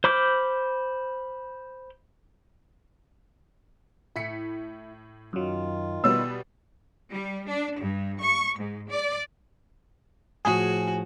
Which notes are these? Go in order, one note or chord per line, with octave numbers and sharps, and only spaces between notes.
C5 B5 D6 F6 G6
A2 E4 B6 C#7
F#2 D#3 F#3 F4
B2 G3 B3 E6
G3
D4
G2
C#6
G#2
D5
A2 F3 F#4 G#4